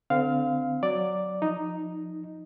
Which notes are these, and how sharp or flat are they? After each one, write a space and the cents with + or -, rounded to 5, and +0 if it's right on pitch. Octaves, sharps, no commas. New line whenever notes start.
D3 +0 C4 -30 F5 +0
F#3 +0 D5 +0
F3 +15 D#4 +0